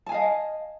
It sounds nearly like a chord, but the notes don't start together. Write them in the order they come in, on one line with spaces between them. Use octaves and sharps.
A5 G#5 F5 D#5